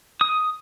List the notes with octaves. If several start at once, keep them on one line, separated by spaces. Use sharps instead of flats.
D#6